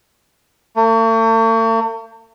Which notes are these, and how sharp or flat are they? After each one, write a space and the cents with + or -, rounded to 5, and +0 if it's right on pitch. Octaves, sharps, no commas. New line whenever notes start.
A3 +45